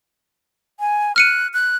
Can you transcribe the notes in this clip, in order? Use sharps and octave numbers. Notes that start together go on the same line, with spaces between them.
G#5
F6 F#6 C#7 D#7
F#6